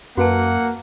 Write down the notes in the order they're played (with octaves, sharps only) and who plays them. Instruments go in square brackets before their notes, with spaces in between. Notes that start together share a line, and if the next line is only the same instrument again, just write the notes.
[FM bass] F#2 [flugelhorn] A#3 [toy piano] F#4 B4 A5 [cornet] F#5